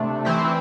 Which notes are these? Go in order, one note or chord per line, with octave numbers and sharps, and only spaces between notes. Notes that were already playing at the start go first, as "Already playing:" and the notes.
Already playing: C3 A3 D4
E3 C4 E4